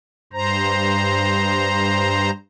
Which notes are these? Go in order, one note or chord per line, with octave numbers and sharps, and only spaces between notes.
G2 C5 A#5